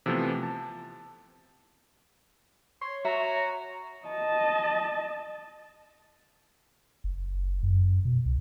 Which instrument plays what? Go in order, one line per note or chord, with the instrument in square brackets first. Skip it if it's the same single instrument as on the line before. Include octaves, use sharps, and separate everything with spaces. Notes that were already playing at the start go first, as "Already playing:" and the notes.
[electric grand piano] C3 E3 F3 A3 B3
A5
[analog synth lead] C#5 [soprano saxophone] C6
[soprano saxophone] F#4 [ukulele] E5 [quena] A#5
[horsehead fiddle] D#5 A5
[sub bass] F#1
F#2
B2
C2